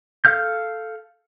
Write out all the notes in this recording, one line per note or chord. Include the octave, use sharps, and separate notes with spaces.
A4 F5 F6 G6